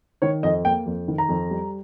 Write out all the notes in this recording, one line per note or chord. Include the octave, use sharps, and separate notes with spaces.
D#3 C#5
F2 D#5
A#3 G5
F2
D#3
A#5
F2
G3